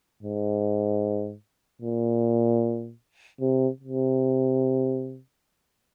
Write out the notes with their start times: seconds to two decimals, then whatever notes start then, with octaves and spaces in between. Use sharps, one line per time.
0.23 G#2
1.82 A#2
3.41 C3
3.81 C3